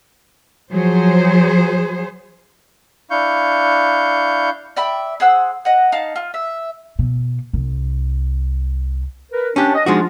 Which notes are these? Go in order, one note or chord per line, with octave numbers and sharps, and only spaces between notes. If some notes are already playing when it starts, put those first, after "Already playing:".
F3 F#3 G#4 C5
D4 E4 F5 C#6 G6
D5 E5 G5 B5
G#4 C5 F#5 E6
D#5 F#5
D#4 F5 A5
F4
E5
B2
C2
A#4 B4
C#4 D4 G4
D#5
F3 G#3 D4 D#4 F4 F#4